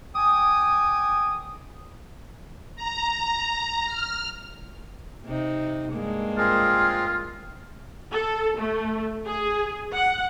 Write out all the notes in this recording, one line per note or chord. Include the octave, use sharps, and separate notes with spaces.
G5 G#5 D6 D#6
A#5
F6
C3 D#4
G2 G#3 A#3
C4 F4 G#4 A#4
A4
A3
G#4
F#5